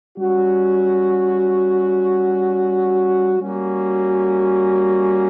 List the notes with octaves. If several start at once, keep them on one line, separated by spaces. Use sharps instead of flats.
G3 C#4 F#4
G3 A#3 C#4 F#4